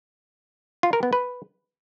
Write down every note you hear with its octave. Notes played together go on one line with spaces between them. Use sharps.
F4
A#4
B3
B4